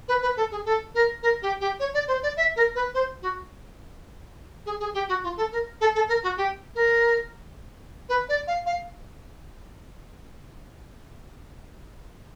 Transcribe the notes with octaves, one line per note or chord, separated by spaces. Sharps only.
B4
B4
A4
G#4
A4
A#4
A#4
G4
G4
C#5
D5
C5
D5
E5
A#4
B4
C5
F#4
G#4
G#4
G4
F#4
F4
A4
A#4
A4
A4
A#4
F#4
G4
A#4
B4
D5
F5
F5